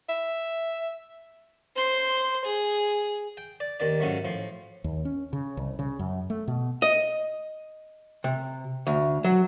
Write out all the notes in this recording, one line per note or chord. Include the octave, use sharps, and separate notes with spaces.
E5
C5 C6
G#4
G5
D5
D#2 D#3 D5
G#2 C#3 F#3 A3
A2 F3
D#2
C#4
C#3
C2
C#3
F#2
A3
B2
D#5
C3
D2
F#3